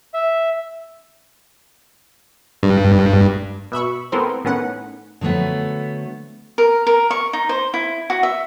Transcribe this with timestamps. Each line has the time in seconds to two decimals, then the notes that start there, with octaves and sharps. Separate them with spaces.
0.14 E5
2.63 G2
3.72 B2 E5 B5 C#6
4.12 A3 B3 C4 E4 A#4 C5
4.45 A2 D#3 B3 C#4 F#5
5.21 D3 F3 F#3 A3 B3
6.58 A#4
6.87 A#4
7.10 C#6
7.33 D#4
7.49 C5
7.74 E4
8.10 F#4
8.23 E5